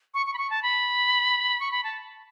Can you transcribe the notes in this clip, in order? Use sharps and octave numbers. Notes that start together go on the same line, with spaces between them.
C#6
C#6
B5
C#6
A5
B5
C#6
B5
A5